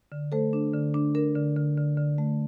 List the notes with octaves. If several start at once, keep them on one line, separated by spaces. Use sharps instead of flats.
D3
A3 A4 C5
D4
D3
D4
D4 A#4
D3
D3
D3
D3
A3